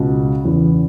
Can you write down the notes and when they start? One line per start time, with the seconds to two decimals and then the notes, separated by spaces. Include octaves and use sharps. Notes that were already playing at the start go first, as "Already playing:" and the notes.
Already playing: C#2 B2
0.45 E2 C#3 E3